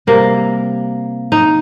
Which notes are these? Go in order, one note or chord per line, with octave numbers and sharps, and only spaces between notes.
C3 G3 A#3
D#4